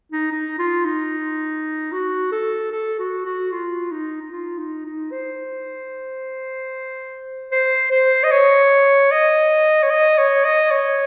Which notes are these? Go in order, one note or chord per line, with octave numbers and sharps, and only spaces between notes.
D#4
D#4
F4
D#4
F#4
A4
A4
F#4
F#4
F4
D#4
D#4
F4
D#4
D#4
C5
C5
C5
D#5
C#5
D#5
C#5
D#5
C#5
D#5
C#5